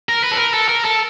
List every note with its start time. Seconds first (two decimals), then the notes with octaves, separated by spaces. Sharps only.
0.09 A#4
0.23 B4
0.31 A4
0.38 A#4
0.54 A4
0.69 A#4
0.84 A4